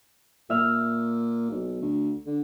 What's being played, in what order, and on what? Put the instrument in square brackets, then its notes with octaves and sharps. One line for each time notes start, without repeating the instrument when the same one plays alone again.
[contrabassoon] A#2 [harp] E5 F6
[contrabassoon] B1
D2
D3